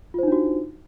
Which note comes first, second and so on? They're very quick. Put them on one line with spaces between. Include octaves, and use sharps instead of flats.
F4 C5 D#4 D4 F#4